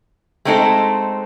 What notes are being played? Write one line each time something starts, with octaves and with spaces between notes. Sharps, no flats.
G#3 A3 C4 D#4 A4